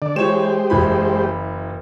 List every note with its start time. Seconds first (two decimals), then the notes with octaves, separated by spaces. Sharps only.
0.02 D3 D5
0.16 E3 G#3 G4 C5 C#5 E7
0.70 F#1 E3 B5